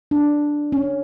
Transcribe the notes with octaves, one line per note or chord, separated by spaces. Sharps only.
D4
C#4